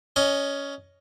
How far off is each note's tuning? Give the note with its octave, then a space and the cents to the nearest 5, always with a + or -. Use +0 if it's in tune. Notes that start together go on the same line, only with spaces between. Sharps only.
C#4 +10 D#5 +0